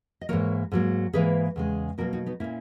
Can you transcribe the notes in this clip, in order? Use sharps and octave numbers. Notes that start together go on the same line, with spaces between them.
D#5
G#2 E3 A#3 A#4 C#5
G#2 F#3 A#3
G#2 E3 A#3 G#4 B4
E2 C#3 G#3
B2 F#3 A#3 F#4 A#4
D#4 F#4
B3 D#4
A#2 A#3 C#4 E4